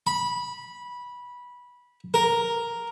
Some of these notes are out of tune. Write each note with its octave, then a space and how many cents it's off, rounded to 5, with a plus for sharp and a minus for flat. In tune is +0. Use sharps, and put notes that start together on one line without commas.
B5 -15
A#4 +0